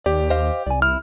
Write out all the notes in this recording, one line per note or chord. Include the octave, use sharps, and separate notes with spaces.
D#2 G4 D5
C5 D#5 F5
C2 D5 G#5
E4 F6